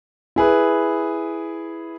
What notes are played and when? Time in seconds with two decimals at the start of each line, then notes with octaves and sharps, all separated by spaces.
0.36 E4 G#4 B4